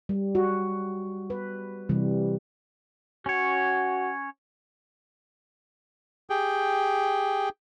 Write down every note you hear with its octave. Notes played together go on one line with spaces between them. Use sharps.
G3
F#4
B4
C3 E3 G3
C#4 F#4 C#5
G4 G#4 G5